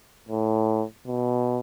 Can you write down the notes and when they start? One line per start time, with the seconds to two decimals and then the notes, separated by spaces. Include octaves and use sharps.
0.29 A2
1.07 B2